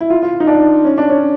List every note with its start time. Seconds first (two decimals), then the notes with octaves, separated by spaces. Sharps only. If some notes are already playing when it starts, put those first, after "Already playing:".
0.01 E4
0.10 F4
0.23 F4
0.40 D#4
0.47 D4
0.85 C#4
0.98 D4
1.10 C#4